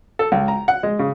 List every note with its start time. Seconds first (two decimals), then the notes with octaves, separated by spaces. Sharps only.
0.19 A4
0.32 C#2
0.48 A#5
0.68 F#5
0.83 G#3
0.99 C#3